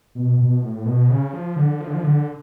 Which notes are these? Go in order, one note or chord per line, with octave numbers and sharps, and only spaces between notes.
B2
B2
A2
B2
C#3
F3
D3
F3
D3
F3
D3